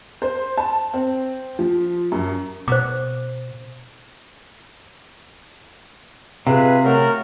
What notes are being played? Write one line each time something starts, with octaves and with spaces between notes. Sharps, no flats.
C5
A5
C4
F3
F#2
B2 C5 D6
C3 F4 G#4 B4
F#3 A3 A#4